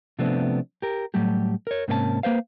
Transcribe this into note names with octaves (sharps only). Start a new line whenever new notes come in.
C3 F3 A3 B3 C4 D4
G4 A#4
A2 F#3 G3 A3 G4
A#4 C#5
G#2 C3 A#3 C#4 F4 A5
A#3 B4 C5 F5